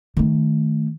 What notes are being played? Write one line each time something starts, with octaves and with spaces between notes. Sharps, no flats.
D#3 A3